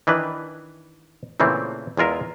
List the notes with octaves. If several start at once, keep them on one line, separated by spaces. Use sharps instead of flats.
D#3 E3 D4 B4
A#2 C#3 E3 A3 C4
E2 G#3 F4 A#4 E5